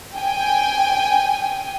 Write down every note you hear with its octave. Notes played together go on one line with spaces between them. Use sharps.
G5 G#5